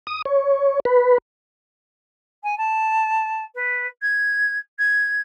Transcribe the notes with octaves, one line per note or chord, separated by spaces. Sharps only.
D#6
C#5
B4
G#5
A5
B4
G#6
G#6